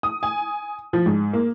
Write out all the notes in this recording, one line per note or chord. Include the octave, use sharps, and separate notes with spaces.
D#6
G#5
F3
G#2
A#3